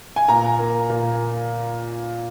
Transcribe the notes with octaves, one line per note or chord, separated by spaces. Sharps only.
G#5
A#2 A#5
A#3
A#2